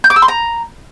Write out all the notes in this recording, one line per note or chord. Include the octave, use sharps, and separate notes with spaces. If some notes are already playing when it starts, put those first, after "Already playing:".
G6
D6
E6
C6
A#5